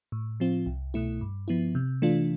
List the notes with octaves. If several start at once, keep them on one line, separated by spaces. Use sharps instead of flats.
A2
F3 C4 F4
C2
B2 A3 E4
G2
F3 B3 E4
C3
E3 A3 D4 F4